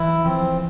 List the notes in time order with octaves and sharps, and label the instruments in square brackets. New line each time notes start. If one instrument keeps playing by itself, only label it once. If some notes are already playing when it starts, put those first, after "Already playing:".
Already playing: [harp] E3 [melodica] E4
[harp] F3 [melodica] C4